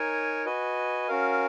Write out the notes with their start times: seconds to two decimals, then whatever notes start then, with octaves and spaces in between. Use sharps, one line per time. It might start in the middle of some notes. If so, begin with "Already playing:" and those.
Already playing: D#4 A#4 C#5 G#5
0.45 F#4 B4 D#5 G#5
1.08 C#4 F#4 A#4 F5